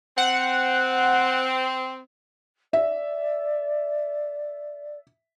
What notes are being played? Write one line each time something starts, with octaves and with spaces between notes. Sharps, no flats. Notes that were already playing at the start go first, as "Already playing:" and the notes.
C4 F#5
D5 E5